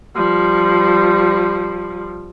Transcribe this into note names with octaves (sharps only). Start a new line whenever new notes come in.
F3 G3